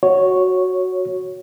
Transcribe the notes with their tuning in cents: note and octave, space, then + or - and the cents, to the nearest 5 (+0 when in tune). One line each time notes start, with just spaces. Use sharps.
F#4 +0 C#5 +0